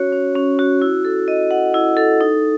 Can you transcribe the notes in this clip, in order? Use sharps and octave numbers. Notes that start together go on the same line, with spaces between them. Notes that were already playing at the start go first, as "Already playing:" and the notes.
Already playing: C#4 F#4 C#5
C#4
C#4
F#4
E4
A4
D#5
F#5
E4
A4
D#4